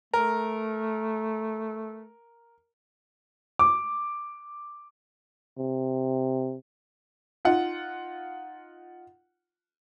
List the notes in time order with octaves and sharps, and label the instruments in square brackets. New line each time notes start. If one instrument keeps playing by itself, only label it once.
[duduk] A3 [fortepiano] A#4
[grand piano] D6
[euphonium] C3
[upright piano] D#4 F4 F#5